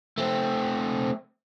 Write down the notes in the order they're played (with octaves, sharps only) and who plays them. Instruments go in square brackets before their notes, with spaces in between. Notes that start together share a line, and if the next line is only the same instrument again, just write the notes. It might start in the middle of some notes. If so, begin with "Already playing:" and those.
[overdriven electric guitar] A3 C4